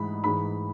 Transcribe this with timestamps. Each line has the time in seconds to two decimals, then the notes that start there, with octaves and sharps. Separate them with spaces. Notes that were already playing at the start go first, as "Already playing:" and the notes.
Already playing: G#2 E3 G#3 B5
0.24 G#2 E3 G#3 B5